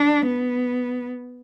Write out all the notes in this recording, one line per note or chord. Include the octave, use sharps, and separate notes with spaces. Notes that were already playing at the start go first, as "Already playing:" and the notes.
Already playing: D4
B3